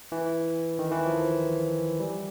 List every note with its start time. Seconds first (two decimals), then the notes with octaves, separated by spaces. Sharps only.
0.12 E3
0.79 D#3
0.91 E3
1.06 F3
2.00 G3